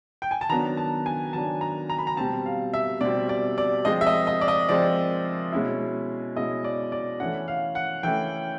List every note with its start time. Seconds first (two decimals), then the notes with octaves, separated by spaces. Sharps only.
0.22 G5
0.31 G#5
0.41 A5
0.50 D#3 F#3 B3 D4 A#5
0.77 A5
1.06 G#5
1.33 D#3 F#3 B3 D4 A5
1.61 A#5
1.90 A#5
1.98 B5
2.07 A#5
2.17 B2 G3 C4 A5
2.46 F5
2.74 E5
3.01 B2 G3 C4 D5
3.29 D5
3.58 D5
3.85 F3 G#3 C4 D#5
4.01 E5
4.06 D#5
4.27 D#5
4.41 D5
4.48 D#5
4.69 F3 G#3 C4 D5
5.52 B2 G#3 C#4 E4
6.36 B2 G#3 C#4 E4 D#5
6.64 D5
6.92 D5
7.20 E3 A3 C#4 E4 F#5
7.48 F5
7.75 F#5
8.03 E3 A3 C#4 E4 G5